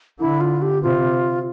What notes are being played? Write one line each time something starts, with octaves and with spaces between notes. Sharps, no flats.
D3 E4
F4
G4
C3 F4